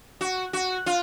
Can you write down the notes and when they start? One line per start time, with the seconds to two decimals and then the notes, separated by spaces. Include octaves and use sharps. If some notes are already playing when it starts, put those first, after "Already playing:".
0.21 F#4
0.53 F#4
0.86 F4